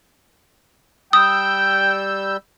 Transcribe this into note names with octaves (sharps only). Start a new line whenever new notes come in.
G3 G5 D#6 E6 G6